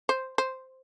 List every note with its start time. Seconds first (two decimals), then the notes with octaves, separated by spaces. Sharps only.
0.09 C5
0.38 C5